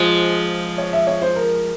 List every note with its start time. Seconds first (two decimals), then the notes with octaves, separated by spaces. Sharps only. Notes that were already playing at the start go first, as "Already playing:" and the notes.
Already playing: F3 G#3 F4
0.78 C#5
0.93 E5
1.07 C#5
1.22 C5
1.36 A#4